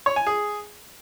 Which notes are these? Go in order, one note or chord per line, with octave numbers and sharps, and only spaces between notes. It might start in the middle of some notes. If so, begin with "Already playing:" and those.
C#5
G#5
G#4